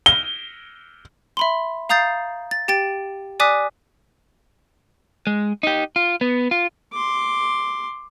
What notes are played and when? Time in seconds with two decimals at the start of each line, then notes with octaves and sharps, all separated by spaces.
0.06 G7
1.37 E5 B5 C6
1.89 F5 A#5 D#6 G6 A6 C7
2.51 A6
2.68 G4 G5 A6 D7
3.40 D5 G#5 D6 D#6 F#6 B6
5.27 G#3
5.63 D#4 G4
5.96 F4
6.21 B3
6.51 F4
6.92 C6 D6